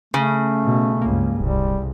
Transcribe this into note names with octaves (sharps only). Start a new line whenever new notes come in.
C#3 A3 C#4
B2
C#2 G2 A#3
D1 C2 G3